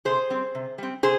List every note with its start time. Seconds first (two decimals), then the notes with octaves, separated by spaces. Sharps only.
0.05 C3 G#4 C5
0.30 G3 C4
0.55 C3
0.78 G3 C4
1.03 C3 G#4 C5